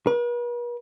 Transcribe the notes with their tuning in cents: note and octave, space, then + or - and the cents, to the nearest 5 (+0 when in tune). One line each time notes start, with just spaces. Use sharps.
B4 -45